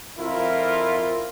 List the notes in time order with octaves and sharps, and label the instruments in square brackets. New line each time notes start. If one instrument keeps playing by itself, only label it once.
[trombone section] F2 E4 F4 A#4